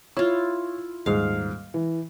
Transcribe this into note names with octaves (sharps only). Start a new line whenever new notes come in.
E4 F4 C#5
D#1 G#2 F5
E3